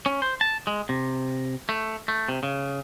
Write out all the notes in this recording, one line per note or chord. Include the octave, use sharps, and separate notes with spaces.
C#4
C5
A5
G#3
C3
A3
A3
C3
C#3